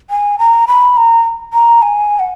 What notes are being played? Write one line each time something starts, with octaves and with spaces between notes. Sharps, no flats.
G#5
A#5
B5
A#5
A#5
G#5
F#5